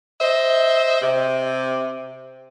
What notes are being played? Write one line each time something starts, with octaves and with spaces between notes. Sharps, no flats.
C5 D#5 E5
C3